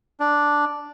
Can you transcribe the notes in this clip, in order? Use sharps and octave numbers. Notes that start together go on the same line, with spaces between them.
D4